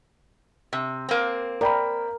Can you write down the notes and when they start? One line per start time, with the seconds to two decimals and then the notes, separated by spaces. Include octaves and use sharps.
0.73 C3
1.09 A#3 C4
1.61 A#4 D5 G5 B5